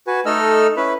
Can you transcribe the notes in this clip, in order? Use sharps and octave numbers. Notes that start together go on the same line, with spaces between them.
F#4 B4 G#5
A3 D#4 A4 D#5 E6 F6
C#4 E4 B4 B5